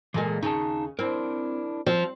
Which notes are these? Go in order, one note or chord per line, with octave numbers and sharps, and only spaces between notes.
A#2 E3 G#3 A4 A#4
D#2 C#3 D#4 A5
C4 D4 E4 A#4
F3 C4